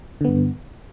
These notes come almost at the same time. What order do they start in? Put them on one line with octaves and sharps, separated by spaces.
D3 B3 G2